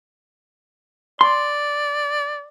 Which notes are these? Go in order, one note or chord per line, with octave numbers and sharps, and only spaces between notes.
D5 C6